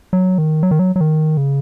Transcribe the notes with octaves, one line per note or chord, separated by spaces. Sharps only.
F#3
D#3
F#3
D#3
F#3
F#3
D#3
C#3